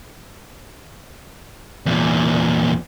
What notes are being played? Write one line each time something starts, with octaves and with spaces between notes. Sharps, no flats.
E2 A#2